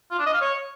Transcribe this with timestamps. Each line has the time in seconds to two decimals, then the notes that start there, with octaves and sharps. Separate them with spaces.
0.11 F4
0.19 D4
0.26 D#5
0.34 F5
0.41 C#5